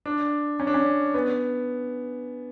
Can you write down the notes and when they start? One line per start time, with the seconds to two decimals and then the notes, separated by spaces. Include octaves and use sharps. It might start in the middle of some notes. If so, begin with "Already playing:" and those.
0.06 D4
0.60 C#4
0.67 D4
0.74 C#4
1.14 B3